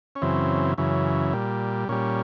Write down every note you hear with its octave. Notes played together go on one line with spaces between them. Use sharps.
C#4
F#2 C#3 E3 C4
F#2 C#3 E3
A#2 G3
A#2 G3 C#4